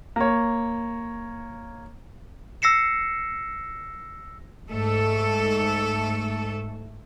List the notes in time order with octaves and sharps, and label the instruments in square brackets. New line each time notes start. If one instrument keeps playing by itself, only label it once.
[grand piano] A#3 C#5
[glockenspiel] E6 A#6 C7 C#7 E7
[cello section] G#2 A3 A4